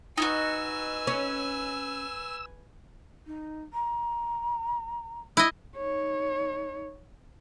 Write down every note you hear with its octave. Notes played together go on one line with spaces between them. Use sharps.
D#4 E4 F#4 B4 G#5 E6
C#4
D#4
A#5
E4 D#5 D#6
D#4 C#5